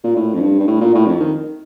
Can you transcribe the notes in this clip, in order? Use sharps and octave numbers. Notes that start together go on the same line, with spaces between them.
A#2
A2
F2
G2
G2
A2
A#2
A2
F2
D#3